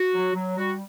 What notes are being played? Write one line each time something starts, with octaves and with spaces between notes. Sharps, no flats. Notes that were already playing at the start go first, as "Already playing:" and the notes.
Already playing: F#4
F#3
F#3
G3 F#4